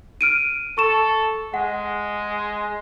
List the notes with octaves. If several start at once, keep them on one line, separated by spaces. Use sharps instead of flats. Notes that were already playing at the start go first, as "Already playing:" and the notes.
F6 D7 D#7
A4 C#6 E7
G#3 F#5